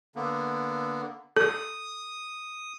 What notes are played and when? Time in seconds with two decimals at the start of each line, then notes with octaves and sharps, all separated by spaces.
0.16 D3 A#3 B3
1.37 A4 D#6